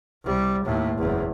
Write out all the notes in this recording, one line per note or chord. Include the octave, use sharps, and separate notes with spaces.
C2 G3
D#2 A2
F#1 E2